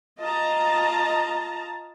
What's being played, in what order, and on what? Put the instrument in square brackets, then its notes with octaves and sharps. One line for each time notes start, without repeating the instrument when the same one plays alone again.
[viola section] F4 D#5 A5 A#5